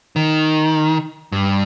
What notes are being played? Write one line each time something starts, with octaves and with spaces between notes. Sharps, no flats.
D#3
G2